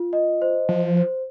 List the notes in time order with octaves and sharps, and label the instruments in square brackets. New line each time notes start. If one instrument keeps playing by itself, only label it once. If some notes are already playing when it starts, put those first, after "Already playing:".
Already playing: [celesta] F4
D#5
C5
[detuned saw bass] F3 [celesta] C5
[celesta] C5